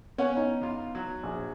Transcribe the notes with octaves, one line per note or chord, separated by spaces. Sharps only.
B3 C#4 C#5 F#5
D#4
E2 F4
F#3
A#1